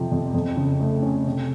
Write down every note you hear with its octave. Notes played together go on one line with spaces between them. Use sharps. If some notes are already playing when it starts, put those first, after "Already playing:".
Already playing: F2 C3 F3
F2
F2
C#3
A3
C#4
C3